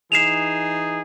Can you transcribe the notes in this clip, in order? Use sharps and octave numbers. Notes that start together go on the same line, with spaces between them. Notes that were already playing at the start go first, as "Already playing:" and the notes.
E3 D#4 G#4 C7 E7 F7